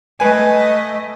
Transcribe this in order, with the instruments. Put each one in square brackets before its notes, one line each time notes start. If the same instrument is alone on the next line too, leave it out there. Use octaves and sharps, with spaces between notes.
[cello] A3 D#5 [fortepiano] B4 G#5